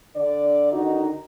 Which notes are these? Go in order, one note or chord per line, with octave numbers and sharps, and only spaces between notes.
D3 D5
D3 D#3 D#4 F#4